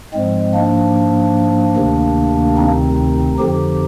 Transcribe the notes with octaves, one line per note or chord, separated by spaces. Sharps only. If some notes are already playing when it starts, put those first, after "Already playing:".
G#2 F3 G#3 C4
A#3 D4
D2 C3 D#3
C4 D#4
F2 D3 F3 D#4 G4